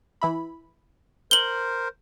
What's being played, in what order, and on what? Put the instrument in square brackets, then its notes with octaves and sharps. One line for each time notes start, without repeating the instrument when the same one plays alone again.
[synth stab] E3 E4 B5
[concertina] A#4 C5 [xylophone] F#7 G7